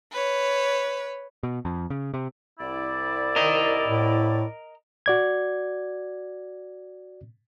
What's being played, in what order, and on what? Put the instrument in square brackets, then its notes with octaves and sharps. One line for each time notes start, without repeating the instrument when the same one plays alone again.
[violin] B4 C#5
[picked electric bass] B2
F2
C#3
C3
[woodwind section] C2 E4 D5
[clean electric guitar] A#4 D#5
[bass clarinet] A2
[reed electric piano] F#4 D5 G#6